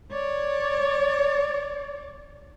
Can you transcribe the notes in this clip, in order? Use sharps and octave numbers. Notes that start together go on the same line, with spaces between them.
C#5 D5